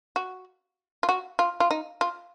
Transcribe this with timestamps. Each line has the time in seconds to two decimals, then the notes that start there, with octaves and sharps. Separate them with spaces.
0.16 F#4
1.03 F4
1.09 F#4
1.39 F4
1.60 F4
1.71 D#4
2.01 F4